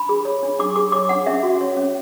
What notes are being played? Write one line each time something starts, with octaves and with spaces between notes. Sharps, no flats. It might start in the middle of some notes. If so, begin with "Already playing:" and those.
Already playing: D4 B5
G#4
C#5
D4
D4 D6
G#4 D6
C#5 D6
D4 F#5
C#4 E5
F#4
C#5
C#4